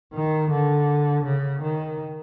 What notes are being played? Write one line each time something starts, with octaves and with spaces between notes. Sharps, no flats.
D#3
D3
C#3
D#3